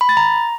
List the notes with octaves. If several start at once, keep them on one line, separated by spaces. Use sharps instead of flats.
B5
A6
A#5